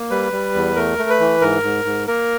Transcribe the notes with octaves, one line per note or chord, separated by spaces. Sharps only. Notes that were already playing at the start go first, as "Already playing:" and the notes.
Already playing: A#3
G3 B4
G3
E2
A3 A#4
A3
B4
E3
G#2 A#4
G#2
G#2
A#3 A#4